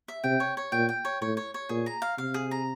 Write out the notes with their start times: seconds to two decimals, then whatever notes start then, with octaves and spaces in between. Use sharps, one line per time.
0.08 E5
0.24 C3 G5
0.40 C#5
0.57 C#5
0.72 A#2 G5
0.89 G5
1.05 C#5
1.21 A2 C#5
1.37 C#5
1.54 C#5
1.69 A#2 G#4
1.86 A#5
2.02 F5
2.18 C3 F5
2.34 G#4
2.51 A#5